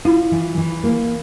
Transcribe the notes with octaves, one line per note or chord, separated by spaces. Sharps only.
E4 F4
E3
E3
A#3